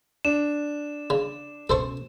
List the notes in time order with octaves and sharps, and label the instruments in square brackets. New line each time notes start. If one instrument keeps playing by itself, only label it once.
[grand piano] D4 [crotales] E7
[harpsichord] C#3
[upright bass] B2 C#4 [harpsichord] A4 C5 C#6